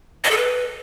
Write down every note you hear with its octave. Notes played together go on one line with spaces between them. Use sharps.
D#5
A4
B4